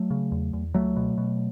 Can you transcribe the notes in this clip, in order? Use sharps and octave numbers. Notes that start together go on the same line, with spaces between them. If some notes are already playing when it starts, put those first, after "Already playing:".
Already playing: F#3 A3
C#3
E2
E2
C#2 F#3 A3
B2
B2